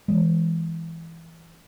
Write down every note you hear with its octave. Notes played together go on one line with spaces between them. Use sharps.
E3 G#3